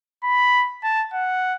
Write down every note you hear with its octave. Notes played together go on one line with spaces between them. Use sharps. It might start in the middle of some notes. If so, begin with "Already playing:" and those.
B5
A5
F#5